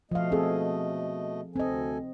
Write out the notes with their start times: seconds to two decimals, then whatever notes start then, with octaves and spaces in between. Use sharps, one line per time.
0.11 B2 F3 A3 D#5 F5
0.32 C4 G#4 A4
1.56 D2 C4 A4 D#5 G#5